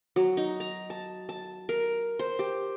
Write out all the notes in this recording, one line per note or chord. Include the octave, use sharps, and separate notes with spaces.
F#3
D#4
A#5
A5
A5
A#4
C5
G4